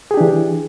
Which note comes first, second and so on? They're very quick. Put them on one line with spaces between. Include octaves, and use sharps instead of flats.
G#4 G4 D4 E3